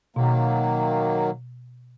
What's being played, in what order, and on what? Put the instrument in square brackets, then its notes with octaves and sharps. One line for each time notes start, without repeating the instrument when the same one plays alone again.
[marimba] B2 [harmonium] D#3 F#3 A#3